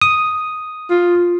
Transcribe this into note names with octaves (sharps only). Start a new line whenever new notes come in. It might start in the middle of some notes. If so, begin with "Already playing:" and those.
D#6
F4